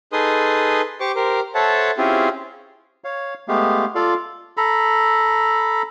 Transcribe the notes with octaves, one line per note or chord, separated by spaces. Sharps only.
D#4 G#4 A4 B4 C6 D#6
G4 C5 C#6 D6
G4 A#4 C5
A4 C5 C#5 E5 F#5 A5
C4 C#4 E4 F4 G4 G#4
C#5 F5
G#3 A3 B3 G4 F5
F4 A4 D5 F5
A4 A#5 B5